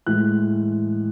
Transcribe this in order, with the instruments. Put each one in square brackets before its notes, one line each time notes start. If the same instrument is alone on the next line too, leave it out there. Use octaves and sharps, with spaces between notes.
[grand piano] A2 E3 G#3 F#6